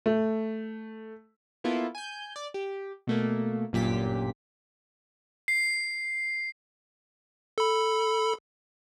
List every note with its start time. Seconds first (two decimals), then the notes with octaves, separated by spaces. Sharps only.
0.06 A3
1.64 A#3 B3 E4 F4 A4
1.95 G#5 G6
2.36 D5
2.54 G4
3.07 B2 A3 A#3
3.73 G1 F#2 A#2 G4 B6
5.48 C7
7.58 A4 B5